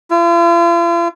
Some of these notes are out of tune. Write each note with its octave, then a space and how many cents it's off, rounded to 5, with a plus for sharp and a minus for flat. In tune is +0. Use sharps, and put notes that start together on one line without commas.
F4 -45